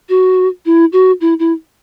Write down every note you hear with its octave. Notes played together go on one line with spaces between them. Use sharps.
F#4
E4
F#4
E4
E4